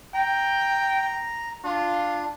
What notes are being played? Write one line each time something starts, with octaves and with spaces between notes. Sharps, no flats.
G5 A#5
D4 F4